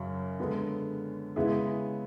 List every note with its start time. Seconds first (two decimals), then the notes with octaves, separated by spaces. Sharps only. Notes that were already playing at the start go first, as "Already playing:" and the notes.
Already playing: F#2 C#3 F#3 C#4
0.40 D3 G#3 B3
1.36 C#3 G#3 B3 E4 G#4